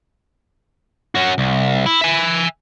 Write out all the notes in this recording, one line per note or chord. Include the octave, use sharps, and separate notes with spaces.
C#4 F#4
C2
E4
E5 G#5